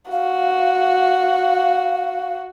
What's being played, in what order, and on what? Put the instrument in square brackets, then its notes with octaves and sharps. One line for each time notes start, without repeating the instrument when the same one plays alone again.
[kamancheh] F#4 [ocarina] F5